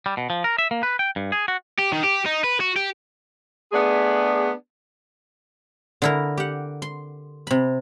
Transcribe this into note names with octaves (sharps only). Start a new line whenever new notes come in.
G3
B2
F3
A#4
E5
A#3
B4
G5
G2
G#4
F#4
G4
D#3
G4
D#4
B4
F#4
G4
A3 B3 D4 G#4
D3 E4 A#4
G4 F#5
C6
C3 B5